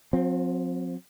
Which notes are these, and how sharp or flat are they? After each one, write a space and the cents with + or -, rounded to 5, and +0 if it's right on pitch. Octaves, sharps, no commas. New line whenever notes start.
F3 +45 C4 +0